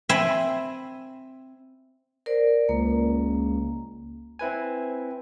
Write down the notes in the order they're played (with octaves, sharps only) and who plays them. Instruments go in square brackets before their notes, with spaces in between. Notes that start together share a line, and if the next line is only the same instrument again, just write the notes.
[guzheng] C4 E5 G#5 B5
[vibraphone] A#4 C5 D5
[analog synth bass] C#2 [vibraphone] A#3
[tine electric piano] C4 E4 B4 G#5